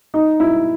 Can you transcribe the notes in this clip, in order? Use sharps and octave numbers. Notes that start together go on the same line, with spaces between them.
D#4
E4